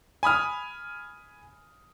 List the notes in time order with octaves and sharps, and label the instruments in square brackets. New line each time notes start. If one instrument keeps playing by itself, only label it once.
[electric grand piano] G#5 B5 D#6 F6